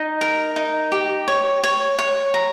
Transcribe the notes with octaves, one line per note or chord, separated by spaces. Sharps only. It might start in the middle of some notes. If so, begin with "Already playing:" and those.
Already playing: D#4
A#4
D#4
G4
C#5
C#5
C#5
A#5